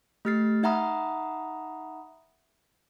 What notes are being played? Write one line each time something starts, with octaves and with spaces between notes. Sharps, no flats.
A3 G4 F6 A6 C7
D#4 E5 F#5 A#5 B5 D#6